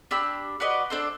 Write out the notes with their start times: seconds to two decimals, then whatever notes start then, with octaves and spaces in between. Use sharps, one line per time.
0.11 D4 G4 B5 E6
0.60 F#4 B4 D5 D#5
0.90 D4 A4 C5